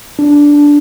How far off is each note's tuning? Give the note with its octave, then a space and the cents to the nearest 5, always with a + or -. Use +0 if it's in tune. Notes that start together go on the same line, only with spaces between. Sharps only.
D4 -10